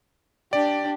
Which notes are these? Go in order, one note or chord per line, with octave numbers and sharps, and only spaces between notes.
D4 G4 D5